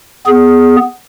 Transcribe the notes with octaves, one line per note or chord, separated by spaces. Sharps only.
B3 G#4